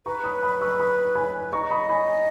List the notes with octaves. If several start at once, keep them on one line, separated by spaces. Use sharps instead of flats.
B4 A#5 C#6
B5 D#6
B5 D#6
C#6 E6
B5 D#6
G#5 B5
D#5 A#5 C#6
B5 D#6
G#5 B5